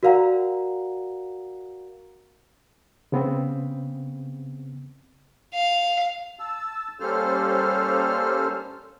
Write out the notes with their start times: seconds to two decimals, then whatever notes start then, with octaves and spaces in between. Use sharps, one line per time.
0.03 F#4 A#4 D5 F5 F#5 A#5
3.12 C#3 B3 C4
5.54 F5
6.39 A5 E6
7.00 G3 A#3 C#4 A4 C5 F6